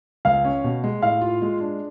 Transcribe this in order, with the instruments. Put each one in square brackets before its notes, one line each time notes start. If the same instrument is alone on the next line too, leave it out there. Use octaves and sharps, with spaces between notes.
[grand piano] C#2 [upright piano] F5
[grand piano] C#4
B2
G#3
[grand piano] A2 [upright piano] F5
[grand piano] F4
G#3
D4